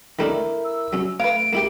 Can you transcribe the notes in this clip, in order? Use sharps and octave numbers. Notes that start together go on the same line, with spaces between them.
D#3 A3 D4 E4 A#4 E5
E6
F#3 C#4
A3 B4 F5 D7
A#3 E4 G4